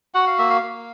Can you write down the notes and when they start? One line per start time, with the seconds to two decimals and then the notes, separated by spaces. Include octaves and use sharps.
0.14 F#4 F#5
0.27 F5
0.38 A#3 E5
0.50 F5
0.63 A#3